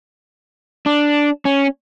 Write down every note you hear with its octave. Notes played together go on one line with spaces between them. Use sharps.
D4
C#4